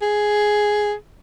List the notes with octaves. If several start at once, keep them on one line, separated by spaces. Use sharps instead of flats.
G#4